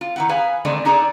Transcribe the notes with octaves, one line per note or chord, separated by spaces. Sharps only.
F4
D#3 E4 F#5
G#4 B4 F5 G#5
D3 D#3 G#3 A3 C4 D4
D4 D#4 G#4 A4 D5